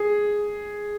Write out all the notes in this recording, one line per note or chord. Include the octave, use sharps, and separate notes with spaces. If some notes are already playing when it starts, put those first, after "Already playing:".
Already playing: G#4